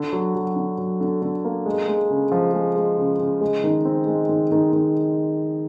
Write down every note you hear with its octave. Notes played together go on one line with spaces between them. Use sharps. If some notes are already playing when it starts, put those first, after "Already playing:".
Already playing: D3
F#3
F#3
D3
F#3
D3
D3
A#3
G#3
G#3
C#3
F3
G#3
G#3
C#3
C#3
G#3
D#3
C4
G#3
D#3
D#3
D#3